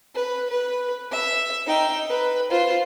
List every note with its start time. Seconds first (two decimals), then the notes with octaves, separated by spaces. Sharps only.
0.15 B4
0.50 B4
1.11 E5
1.66 D#4 G5
2.09 B4
2.50 F4 C5